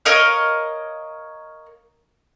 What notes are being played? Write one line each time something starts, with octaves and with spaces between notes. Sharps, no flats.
A#4 C#5 D#5 F5